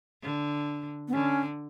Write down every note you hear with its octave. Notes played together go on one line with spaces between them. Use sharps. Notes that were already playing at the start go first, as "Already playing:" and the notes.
D3
B3
D3 C#4